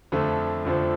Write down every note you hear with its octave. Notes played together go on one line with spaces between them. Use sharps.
F2 D3 F3 A3
F2 D3 F3 A3